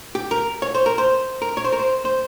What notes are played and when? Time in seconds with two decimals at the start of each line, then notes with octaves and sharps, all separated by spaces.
0.15 G4
0.31 A#4
0.62 C#5
0.75 C5
0.86 A#4
0.98 C5
1.42 A#4
1.57 C#5
1.64 C5
1.72 A#4
1.79 C5
2.05 C5